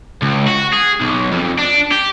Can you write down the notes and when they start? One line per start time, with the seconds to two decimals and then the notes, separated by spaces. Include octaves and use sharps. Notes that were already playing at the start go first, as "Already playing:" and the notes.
0.22 C#2
0.47 F#4
0.73 G#4
1.00 B1
1.32 F2
1.58 D4
1.91 G4